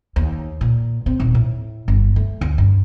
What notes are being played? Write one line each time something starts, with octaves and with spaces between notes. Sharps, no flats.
D#2
A#2
C4
D#1
A2
G1
A3
D2
G2